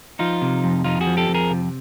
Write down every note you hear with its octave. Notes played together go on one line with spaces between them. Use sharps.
F3 D#4 F4
C3
F2
F2 D#4 F4
F#4 G#4
F3
G4 A4
F2
G#4 A#4
C3